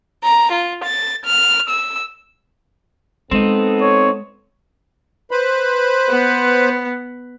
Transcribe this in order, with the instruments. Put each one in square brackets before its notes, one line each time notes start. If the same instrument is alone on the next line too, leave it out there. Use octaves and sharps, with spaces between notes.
[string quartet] A#5
F4
A6
F6
E6
[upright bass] G#3 [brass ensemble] B3 A4 [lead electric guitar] C4 D#4
[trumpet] C#5
[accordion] B4 C5 B5
[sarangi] B3